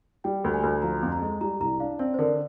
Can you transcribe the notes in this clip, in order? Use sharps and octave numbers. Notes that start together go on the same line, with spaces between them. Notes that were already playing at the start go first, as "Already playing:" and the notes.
G3 G5
D2
G#5
D2
F3 A#5
F2
A#5
G#3
G3 A#5
C2 A#5
D4 F5
C4 D5
C5
D3 A#4